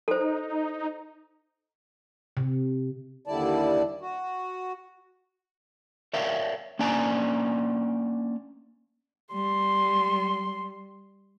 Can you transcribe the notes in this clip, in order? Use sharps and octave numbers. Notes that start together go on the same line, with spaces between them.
D#4 A4 C5
C3
D#2 D3 G3 E4 D5 A5
F#4
A#4 C#5 D5 E5 F5
A#3 C#4 D4 D5 G#5 A#5
G3 C6